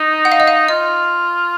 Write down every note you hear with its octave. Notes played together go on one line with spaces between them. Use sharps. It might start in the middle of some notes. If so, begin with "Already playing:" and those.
Already playing: D#4
F#5
F5
D#5
F5
F4 D#5